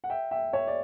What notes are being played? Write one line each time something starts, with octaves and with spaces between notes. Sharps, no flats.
F#5
E5 G5
E5 G5
C#5 E5
D5